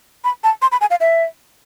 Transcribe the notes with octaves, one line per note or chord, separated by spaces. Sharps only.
B5
A5
C6
B5
G#5
F5
E5